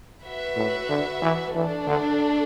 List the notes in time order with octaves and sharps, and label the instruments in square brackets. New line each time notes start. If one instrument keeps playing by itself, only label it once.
[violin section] F#4 B4 E5
[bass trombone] A2
D3
E3
[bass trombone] E3 [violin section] A3 D4 A4
[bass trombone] D3